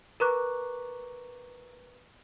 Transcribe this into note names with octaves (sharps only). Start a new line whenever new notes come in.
A#4 B4 A#5 C#6 D6 F#6